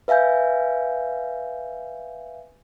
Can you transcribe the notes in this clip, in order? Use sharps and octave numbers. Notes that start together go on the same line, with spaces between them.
B4 E5 F5 G#5 G6